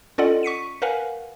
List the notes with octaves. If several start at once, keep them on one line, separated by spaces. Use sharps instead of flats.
C#4 F4 A4 D5 D#5 F#5
C#6 B6 C#7 D#7
A#4 B4 F5 F#5 G#5